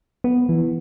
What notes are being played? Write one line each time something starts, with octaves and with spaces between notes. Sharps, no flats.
B3
E3